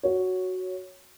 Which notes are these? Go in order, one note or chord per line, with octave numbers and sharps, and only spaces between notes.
F#4 C#5